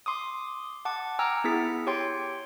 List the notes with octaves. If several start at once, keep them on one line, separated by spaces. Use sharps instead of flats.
C6 D6 D#6
F#5 A5 D6
G5 G#5 A#5 E6 F6
B3 E4 G#4 B6
G4 C#5 G5 C6